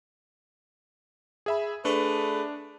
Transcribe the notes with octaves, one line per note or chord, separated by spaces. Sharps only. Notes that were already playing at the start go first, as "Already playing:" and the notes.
G#4 E5 B5
A3 D4 G#4 B4